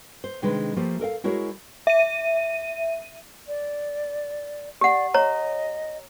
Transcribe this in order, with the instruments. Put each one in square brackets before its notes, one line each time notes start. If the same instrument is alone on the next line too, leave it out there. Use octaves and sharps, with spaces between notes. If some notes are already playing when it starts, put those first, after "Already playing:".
[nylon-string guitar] C5
C3 D#3 G#3 D4 B4
F3 A3 A#3 G4
A4 A#4 D#5 F5
G#3 E4 F#4 G#4 A#4 C#5
[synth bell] E5 D#7
[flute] D5
[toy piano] G4 F#5 [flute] D5
[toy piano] C#5 A#5 [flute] D#5